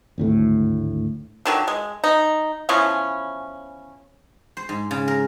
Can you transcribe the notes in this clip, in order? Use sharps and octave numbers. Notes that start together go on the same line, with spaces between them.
G#1 D2 A2
D3 D#3 F#3
G#3
D#4
E3 F3 B3 C#4
C5
G#2
C#3
A#4